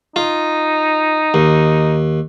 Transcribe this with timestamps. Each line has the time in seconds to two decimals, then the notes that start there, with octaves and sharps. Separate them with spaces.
0.16 D#4 F4
1.34 D#2